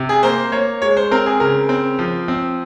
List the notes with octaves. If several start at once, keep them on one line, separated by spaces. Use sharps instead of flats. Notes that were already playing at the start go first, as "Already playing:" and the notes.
Already playing: C3
G#4
A#3 C5
A#3 C#5
G#3 C#5
C5
C4 A#4
G#4
C#3 A#4
C4
F3
C4